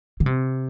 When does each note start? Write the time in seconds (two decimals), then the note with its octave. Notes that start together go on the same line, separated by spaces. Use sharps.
0.20 D3
0.26 C3